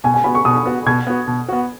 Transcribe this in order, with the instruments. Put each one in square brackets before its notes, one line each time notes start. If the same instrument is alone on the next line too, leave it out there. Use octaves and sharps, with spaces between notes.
[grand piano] B2 [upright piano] G#5
[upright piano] G#5
[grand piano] B3 F#4 [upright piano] B5
[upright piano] C#6
[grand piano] B2 [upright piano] D#6
[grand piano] B3 F#4
[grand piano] B2 [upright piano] G#6
[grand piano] B3 F#4
B2
B3 F#4